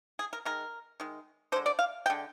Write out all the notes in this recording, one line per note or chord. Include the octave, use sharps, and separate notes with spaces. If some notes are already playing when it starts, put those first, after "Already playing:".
G#4
A#4
D#3 G#3 A#4
D#3 G#3
D3 G#3 C5
D5
F5
D3 G#3 G5